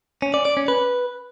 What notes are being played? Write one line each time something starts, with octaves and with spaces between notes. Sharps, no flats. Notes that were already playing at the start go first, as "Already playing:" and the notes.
C#4
D5
D5
C#4
B4